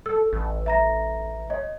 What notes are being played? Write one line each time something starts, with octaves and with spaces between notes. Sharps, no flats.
A4 E6
A1
E5 A#5 A#6
C#5 D#5